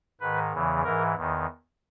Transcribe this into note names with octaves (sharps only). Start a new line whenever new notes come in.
G#2 D#3 B4
E2 C#3 E3
G#2 E3 A#4
E2 D#3